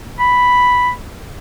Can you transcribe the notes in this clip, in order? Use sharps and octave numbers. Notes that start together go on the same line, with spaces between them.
B5